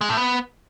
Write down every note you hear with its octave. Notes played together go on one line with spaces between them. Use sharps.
G#3
A2
B3